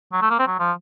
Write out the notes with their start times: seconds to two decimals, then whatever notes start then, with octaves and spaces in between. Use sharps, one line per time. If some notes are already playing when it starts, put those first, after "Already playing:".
0.13 F#3
0.22 A3
0.30 A#3
0.39 C4
0.47 F#3
0.60 F3